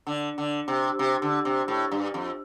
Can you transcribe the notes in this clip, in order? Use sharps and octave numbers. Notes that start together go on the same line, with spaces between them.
D3
D3
C3
C3
D3
C3
A2
G2
F2